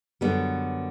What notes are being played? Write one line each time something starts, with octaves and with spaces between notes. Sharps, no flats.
F#2 D3 G3 B3